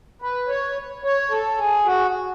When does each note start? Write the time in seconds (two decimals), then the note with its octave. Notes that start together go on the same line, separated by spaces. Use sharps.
0.22 B4
0.48 C#5
1.04 C#5
1.31 A4
1.58 G#4
1.86 F#4